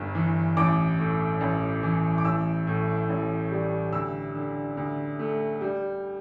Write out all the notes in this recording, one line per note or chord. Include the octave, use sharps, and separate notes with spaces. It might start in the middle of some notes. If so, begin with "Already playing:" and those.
Already playing: G1 G2
E3
A1 D6
A2
A1
E3
D6
A1 E6
A2
A1
G3
D2 E6
D3
D2
A3
G3